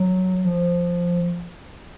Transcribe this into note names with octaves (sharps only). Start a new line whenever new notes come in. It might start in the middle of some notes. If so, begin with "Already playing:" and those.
Already playing: F#3
F3